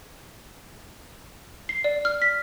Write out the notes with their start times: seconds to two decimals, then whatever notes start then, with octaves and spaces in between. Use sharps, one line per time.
1.69 C7
1.84 D5
2.05 F6
2.22 B6